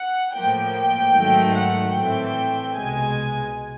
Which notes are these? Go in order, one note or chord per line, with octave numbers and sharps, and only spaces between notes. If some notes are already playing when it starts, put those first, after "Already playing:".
Already playing: F#5
A2 F3 A#3 G5
G5
G#2 D#3 F#3 A3
F#5
A2 E3 A3 C4 G5
C2 B2 G#3 G#5